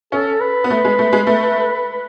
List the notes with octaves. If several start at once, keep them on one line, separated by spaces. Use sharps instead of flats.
C#4 A4
B4
B3
A3 B4
G#3
A3
G#3
A3